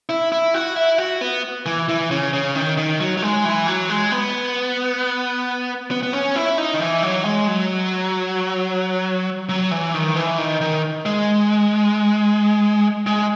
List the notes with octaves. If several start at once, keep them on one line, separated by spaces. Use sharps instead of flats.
E4
E4
F#4
E4
F#4
B3
E3
E3
C#3
C#3
D#3
D#3
F#3
F#3
G#3
E3
F#3
G#3
B3
B3
B3
C#4
E4
D#4
D#3
E3
F#3
G#3
F#3
F#3
E3
D#3
E3
D#3
D#3
G#3
G#3